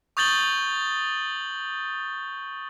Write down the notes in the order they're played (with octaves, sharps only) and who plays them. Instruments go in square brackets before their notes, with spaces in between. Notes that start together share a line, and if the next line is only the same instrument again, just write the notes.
[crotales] C#6 D#6 G6 A6 F#7 G7